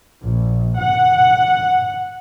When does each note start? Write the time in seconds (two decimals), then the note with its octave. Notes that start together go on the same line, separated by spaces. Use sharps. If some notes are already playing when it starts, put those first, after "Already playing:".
0.23 A#1
0.80 F#5